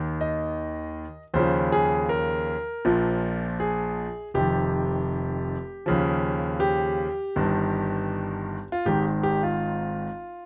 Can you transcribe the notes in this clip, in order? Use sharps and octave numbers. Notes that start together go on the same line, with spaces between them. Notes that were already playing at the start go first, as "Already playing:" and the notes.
Already playing: D#2 D#3
D#5
D#2 C#3 F3 C5
G#4
A#4
A#1 A#2 F3
G#4
F1 F2 D#3 G4
D#2 C#3 F3
G4
G1 G2 D#3
F4
G#1 G#2 D#3 G4
G4
F4